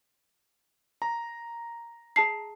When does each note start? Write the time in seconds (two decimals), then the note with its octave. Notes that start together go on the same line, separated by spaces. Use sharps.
1.02 A#5
2.16 G#4 A5 C7